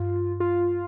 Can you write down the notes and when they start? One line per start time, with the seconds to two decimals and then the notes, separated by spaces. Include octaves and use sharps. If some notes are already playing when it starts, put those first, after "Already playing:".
Already playing: G2 F4
0.40 F4